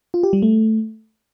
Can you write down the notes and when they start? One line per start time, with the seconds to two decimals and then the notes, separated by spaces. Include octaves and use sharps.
0.14 F4
0.23 G4
0.33 G3
0.42 A3